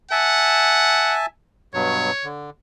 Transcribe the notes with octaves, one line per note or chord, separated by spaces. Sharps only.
E5 F#5 G#5 A5
G2 B2 F#3 C#5
D3